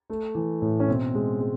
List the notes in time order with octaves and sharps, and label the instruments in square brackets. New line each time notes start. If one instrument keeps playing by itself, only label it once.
[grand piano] A3
E3
A2
C#4
B2 C4
G#3
G#3